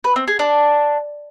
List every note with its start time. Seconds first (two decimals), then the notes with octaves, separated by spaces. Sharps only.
0.04 B4
0.16 C4
0.28 G#4
0.39 D4